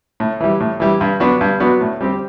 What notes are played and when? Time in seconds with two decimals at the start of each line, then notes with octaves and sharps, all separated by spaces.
0.20 A2
0.40 E3 G3
0.60 A2
0.80 E3 G3
1.01 G2
1.20 F#3 B3 D4 F#4
1.41 G2
1.60 F#3 B3 D4 F#4
1.81 A2
2.01 G3 C4 G4